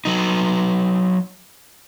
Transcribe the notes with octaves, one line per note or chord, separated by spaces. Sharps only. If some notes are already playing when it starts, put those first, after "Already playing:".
F#3 D#4